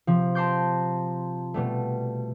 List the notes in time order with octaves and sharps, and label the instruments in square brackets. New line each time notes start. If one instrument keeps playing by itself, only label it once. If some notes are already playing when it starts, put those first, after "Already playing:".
[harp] C3 F3
A5 A#5 C6 D6 G6
B2 G3 A3